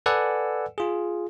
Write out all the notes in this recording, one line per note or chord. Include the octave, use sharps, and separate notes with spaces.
A4 B4 D5 F#5 G#5 E6
F4 G#4